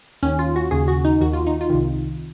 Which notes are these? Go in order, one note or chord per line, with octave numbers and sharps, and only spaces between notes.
D#2 D#3 C#4
F4
F#4
D#2 C#3 G#4
F#4
D#4
D#2 D#3 F#4
F4
D#4
F4
C2 C3 D#3